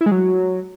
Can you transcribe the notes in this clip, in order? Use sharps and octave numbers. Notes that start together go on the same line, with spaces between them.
E4
G#3
F#3